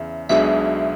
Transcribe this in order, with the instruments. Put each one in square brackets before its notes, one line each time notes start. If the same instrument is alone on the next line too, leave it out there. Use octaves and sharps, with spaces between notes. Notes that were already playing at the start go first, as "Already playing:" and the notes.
Already playing: [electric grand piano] E2 C#3 [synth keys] E5
[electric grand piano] B1 B2 G#3 D4 G#4 [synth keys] E5